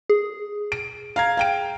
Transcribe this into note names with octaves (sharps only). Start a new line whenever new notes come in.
G#4
D7
F5 A#5 G#6
F5 G5 D7